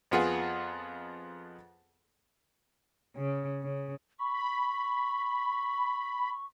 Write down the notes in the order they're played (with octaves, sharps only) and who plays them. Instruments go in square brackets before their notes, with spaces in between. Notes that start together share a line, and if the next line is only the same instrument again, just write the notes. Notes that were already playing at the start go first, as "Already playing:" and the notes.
[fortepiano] F2 B3 F4 G#4 F#5
[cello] C#3
C#3
[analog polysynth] B5 [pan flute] C#6